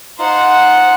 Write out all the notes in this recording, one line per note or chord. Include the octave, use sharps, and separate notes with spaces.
D#4 F4 C5 F#5